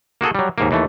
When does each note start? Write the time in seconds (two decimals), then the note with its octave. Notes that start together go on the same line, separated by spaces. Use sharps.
0.21 A#3 F#4 G#4 A4
0.35 F#3 G3
0.58 D#2 G#2 A#3
0.71 D#2 E3 A3